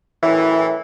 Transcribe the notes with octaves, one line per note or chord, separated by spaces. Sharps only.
F#2 A2 E3